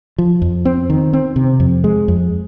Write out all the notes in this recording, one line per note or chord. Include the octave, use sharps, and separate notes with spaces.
F3
F2
C4
D#3
C4
C3
F2
G#3
F2